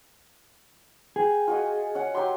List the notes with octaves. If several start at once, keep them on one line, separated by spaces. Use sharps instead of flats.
G#4 G5
F4 F#4 D#5
C#4 F#5
F#3 G4 C6